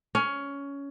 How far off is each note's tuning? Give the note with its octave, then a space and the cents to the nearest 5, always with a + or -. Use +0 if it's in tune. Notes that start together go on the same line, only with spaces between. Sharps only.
C#4 +15